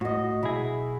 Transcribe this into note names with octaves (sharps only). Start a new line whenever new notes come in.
A2 F#4 D#5
B1 E4 G#4